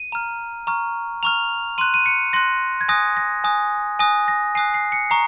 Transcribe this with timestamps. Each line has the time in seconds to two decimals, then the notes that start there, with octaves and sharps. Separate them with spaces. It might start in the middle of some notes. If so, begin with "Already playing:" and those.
Already playing: D#7
0.12 A#5 F6
0.67 A#5 C#6 F6
1.23 A#5 C#6 F6 F7
1.78 C6 F#6 D#7
1.94 D#7
2.06 C#7
2.33 C6 F#6 A#6
2.81 G#6
2.89 G#5 D#6 F#6 A#6
3.17 A#6
3.44 G#5 D#6 F#6
3.99 G#5 D#6 F#6 A#6
4.28 A#6
4.55 G#5 D#6 F#6 C7
4.74 C7
4.92 C#7
5.10 A#5 C#6 C7